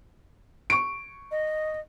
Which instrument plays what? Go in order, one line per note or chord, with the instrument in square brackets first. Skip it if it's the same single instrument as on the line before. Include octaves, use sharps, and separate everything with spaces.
[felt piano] C#6 D7
[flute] D#5